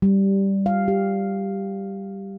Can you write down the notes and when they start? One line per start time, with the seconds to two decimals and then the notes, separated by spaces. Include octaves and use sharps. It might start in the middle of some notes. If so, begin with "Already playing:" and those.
0.02 G3
0.66 F5
0.88 G4